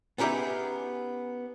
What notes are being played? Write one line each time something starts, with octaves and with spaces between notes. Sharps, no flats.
B3 C#4 D#4 G4 G#4 E5